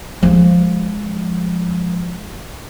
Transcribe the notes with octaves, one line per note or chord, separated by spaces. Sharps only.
F3 G#3